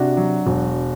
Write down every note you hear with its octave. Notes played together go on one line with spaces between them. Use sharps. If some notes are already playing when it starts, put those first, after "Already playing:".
Already playing: C3 D4 F#4
F#3
E1